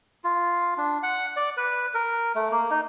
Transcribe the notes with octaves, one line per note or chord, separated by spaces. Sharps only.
F4
D4
F#5
D5
B4
A#4
A3
A#3
D#4